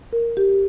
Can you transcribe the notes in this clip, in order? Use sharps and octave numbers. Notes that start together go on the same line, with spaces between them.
A#4
G4